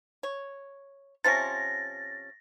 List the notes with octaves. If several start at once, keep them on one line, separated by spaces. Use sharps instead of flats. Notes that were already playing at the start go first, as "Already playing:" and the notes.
C#5
C3 F3 C#4 A6 A#6